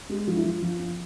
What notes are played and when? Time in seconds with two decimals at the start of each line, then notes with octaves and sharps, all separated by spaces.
0.09 G#3 G4
0.27 F3 F#4
0.37 E4
0.45 F3 F4
0.62 F3
0.79 F3